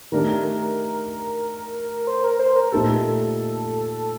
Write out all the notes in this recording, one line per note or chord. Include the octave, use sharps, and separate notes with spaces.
D#3 A3 D4 G4 A#4
C5
A#4
C5
A#4
A#2 A3 D#4 G4 A4